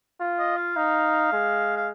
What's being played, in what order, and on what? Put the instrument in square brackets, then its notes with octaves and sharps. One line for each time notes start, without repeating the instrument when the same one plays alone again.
[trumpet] F4
[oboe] D#5
F5
[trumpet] D#4
G#3
[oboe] F5